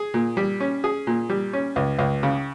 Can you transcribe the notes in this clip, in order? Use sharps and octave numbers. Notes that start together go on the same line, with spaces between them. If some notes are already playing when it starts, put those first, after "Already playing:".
Already playing: G#4
A#2
G3
C#4
G#4
A#2
G3
C#4
C#2
C#2
C#3